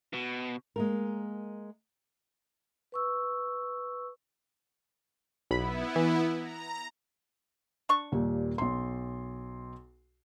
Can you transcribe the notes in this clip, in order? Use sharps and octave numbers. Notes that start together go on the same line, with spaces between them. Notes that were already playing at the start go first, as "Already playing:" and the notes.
B2
G#3 A#3 A#4
B4 C#6 E6
B1 B3 E4 B5
E3
A#5
D4 C#6
D#2 A#2 G3
B1 C6